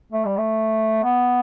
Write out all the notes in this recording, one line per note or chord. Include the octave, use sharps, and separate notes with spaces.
A3
G3
A3
B3